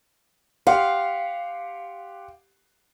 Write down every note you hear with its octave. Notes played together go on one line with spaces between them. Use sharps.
G4 F5 F#5 C6